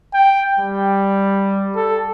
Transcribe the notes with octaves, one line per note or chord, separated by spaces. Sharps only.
G5
G3
A4